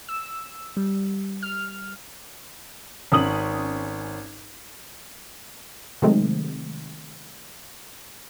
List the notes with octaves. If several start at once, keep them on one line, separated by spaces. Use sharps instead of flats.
E6
G3
F6
G#1 C#4 D#6 F#7
C3 D#3 F#3 G#3 A3 C4